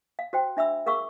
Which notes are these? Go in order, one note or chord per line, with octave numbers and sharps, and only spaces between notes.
F5
F#4 C5 G5
D4 E5 B5 E6
G#4 A#4 F5 C#6 D6 E6